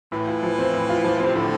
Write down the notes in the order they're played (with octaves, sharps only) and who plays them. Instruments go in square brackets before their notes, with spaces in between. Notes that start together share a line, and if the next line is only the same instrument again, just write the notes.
[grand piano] A2 [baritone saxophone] E3
[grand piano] F4
F3
C4
A2
F4
F3
C4
[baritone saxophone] C3
[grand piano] A2 [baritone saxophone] D3